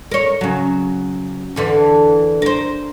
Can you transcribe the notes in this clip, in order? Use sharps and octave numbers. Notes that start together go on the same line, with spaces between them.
A#4 C#5
C#3 F#3
E2 D3 E3
A#4 C5